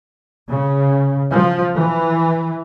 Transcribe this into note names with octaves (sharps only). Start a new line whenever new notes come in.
C#3
F3
E3